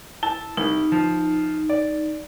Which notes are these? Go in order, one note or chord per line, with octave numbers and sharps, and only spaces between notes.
E4 A5
C2 D#4
F3
D5